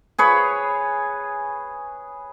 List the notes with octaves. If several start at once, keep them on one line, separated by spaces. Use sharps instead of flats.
G#4 B4 C#5